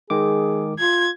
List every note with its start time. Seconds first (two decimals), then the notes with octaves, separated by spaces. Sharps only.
0.10 D#3 G#3 G#4 D6
0.79 F4 G#6